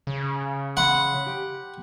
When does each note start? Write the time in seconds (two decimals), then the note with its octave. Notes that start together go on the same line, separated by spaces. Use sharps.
0.07 C#3
0.77 F#5 B5 C6
1.26 G4